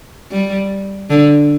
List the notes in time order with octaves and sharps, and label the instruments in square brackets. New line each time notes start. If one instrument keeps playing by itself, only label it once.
[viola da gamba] G3
D3